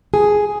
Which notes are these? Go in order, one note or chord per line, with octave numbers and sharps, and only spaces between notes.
G#4